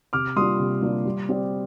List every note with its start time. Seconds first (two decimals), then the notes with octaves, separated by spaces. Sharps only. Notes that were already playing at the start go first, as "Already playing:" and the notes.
0.13 C3 D6 F6
0.36 G3 A#3 D4 F4 C6 D#6
0.60 C3
0.82 G3 A#3 D4 F4
1.05 G3
1.29 C4 G4 D5